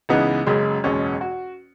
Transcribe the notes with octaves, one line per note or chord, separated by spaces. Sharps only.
C#2 C#3 E3 B3 D#4
F#1 F#2 C#3 G#3
F#1 E2 B2 G#3 C#4
F#4